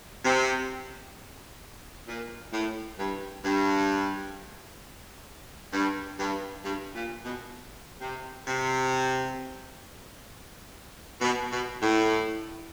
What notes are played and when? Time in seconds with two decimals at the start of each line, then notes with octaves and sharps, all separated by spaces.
0.25 C3
2.08 A#2
2.52 A2
2.99 G2
3.45 G2
5.73 G2
6.19 G2
6.64 G2
6.95 A#2
7.25 B2
8.01 C3
8.47 C3
11.21 B2
11.52 B2
11.82 A2